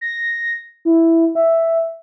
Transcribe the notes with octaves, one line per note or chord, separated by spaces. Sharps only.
A#6
E4
E5